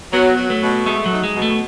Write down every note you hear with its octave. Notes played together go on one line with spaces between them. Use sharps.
F#3 B3
F#3
A3
B2
G#3 A3
F#3
D#4
G#3
B2
A3